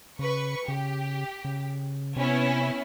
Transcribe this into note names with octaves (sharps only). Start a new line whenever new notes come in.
C#3 B4 C#6
C#3 G4
C#3
C3 B3 C#4 E4